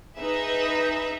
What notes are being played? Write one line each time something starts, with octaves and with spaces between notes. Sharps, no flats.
D#4 G#4 B4 E5